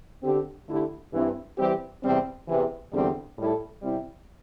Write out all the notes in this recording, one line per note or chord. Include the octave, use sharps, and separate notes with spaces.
D3 C4 G4
D3 A3 E4 G4
G2 E3 C4
E3 G3 C4 G4
E2 C3 G3 C4
E2 C3 E3
E2 D3 G3 C4 G4
A2 G3 E4 A4
C3 G3 C4 E4